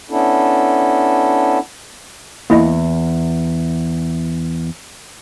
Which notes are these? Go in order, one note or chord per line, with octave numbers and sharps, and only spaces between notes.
B3 C#4 D4 E4 A4
E2 A#3 E4 D#5